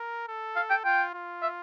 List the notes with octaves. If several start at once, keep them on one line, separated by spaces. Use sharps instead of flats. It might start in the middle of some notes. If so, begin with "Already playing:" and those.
Already playing: A#4
A4
F5
G5
F4 G5
F4
E5